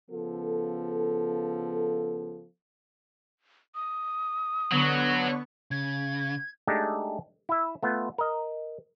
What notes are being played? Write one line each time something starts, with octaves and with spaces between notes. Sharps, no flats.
C#3 F3 B3 A4
D#6
D3 F#3 B3 C#6
C#3 G#6
G#3 A3 D4 D#4 G4 A4
E4 E5
A3 B3 F4
A#4 D#5